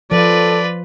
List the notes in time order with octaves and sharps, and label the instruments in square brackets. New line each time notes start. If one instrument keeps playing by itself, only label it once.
[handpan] F3 [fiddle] F4 B4 [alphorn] A4 [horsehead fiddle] D5